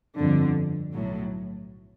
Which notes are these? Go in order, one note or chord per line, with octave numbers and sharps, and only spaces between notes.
G1 F2 D3
B1 A2 F#3